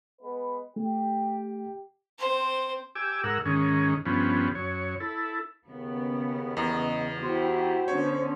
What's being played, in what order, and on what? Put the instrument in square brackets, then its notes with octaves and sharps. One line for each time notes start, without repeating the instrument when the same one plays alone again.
[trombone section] G#3 B3 B4
[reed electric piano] A3 [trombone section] G4
[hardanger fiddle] C4 C5
[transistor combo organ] G4 G#5 D6 E6
G#2 A#4 F#5 E6
G#2 D#3 C#4
G2 F3 B3 C#4
F#2 C#5
E4 A4
[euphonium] D#2 [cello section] C#3 B3
[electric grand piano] E2 [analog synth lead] D#5
[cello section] E4 G4 [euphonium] F#4 [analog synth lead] C5
[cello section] D3 B3 C#4 [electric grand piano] C#5